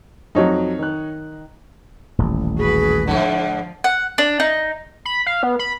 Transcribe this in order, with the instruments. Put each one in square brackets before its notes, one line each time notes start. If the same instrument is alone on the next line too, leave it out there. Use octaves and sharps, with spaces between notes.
[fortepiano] F2 F#3 [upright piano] D#4 C#5
[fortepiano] D#3 F#6
[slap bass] D#1 A1
[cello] F#4 B4 [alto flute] G#4
[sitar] G#2 D3 [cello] F3 [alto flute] F#5
[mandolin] F#5
D4
D#4
[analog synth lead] B5
F5
B3
B5